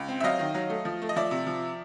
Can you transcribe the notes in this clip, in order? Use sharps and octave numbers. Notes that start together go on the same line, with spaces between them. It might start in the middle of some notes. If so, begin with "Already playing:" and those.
Already playing: C#2
C4
E5
F#3 D#5 F5
D#3
F#3
A3
F3
A3
D#5
F3 D5 E5
C3
F3